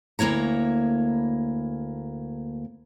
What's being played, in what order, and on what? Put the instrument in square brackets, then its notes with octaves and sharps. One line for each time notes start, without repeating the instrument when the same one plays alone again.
[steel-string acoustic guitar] D2 A#3 E4 C#5 A#5